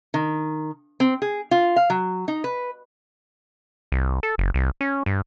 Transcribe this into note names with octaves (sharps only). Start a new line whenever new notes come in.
D#3
C4
G#4
F4
F5
F#3
D#4
B4
C2
A4
F#1
C2
C#4
G2